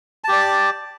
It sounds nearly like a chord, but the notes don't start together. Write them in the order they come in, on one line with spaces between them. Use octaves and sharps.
A5 G4 D5